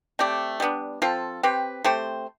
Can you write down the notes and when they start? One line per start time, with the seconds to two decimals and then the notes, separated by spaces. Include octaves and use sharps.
0.19 A3 C4 G4 D5
0.60 G3 B3 D4
1.02 F3 C4 F4 A4
1.43 C4 G4 B4
1.84 A3 C4 G4 C5